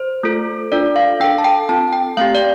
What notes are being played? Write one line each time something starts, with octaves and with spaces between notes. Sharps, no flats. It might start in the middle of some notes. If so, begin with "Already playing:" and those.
Already playing: C5
A3 F4 A4
D4 F4 A4 D5
F5
D4 A4 G5
A5
G5
C4 F4 A4 A5
G5
A3 C4 G4 F5
D5